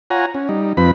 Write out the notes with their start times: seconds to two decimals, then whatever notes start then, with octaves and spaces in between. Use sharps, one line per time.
0.10 F4 C#5 F#5 G#5 A#5
0.35 C#4
0.49 G3 D#4
0.77 F2 F3 C4 B4 B5